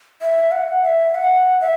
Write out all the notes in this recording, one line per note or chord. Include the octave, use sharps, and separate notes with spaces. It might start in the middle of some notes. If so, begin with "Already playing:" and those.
E5
F#5
E5
F#5
E5